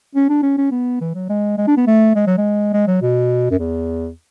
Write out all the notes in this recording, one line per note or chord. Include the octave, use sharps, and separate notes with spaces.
C#4
D4
C#4
C#4
B3
E3
F#3
G#3
G#3
D4
B3
A3
G#3
F#3
G#3
G#3
F#3
B2
F#2
E2